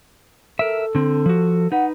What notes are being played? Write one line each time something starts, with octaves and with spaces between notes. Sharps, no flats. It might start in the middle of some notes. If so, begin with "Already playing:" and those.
A4 A#4 E5
D3 C4
F3 F#4
D#4 B4 F#5